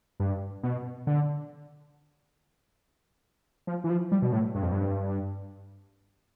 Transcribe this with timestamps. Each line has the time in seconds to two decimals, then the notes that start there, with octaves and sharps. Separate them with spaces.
0.20 G2
0.63 B2
1.07 D3
3.67 F3
3.84 E3
3.90 F3
4.12 G3
4.22 B2
4.33 A2
4.55 G2
4.63 F2
4.72 G2